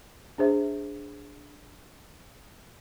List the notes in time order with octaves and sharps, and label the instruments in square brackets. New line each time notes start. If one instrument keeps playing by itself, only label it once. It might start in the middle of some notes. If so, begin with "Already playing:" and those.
[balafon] D4 G#4 C5 E5